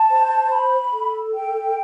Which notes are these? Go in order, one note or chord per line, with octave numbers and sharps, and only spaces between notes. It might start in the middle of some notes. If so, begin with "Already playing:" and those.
Already playing: A5
C5
B5
A4
G5